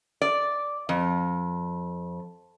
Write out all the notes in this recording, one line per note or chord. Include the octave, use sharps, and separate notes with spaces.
D5
F2